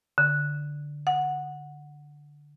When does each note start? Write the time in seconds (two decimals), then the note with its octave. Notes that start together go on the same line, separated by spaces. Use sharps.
0.18 D3
1.07 F#5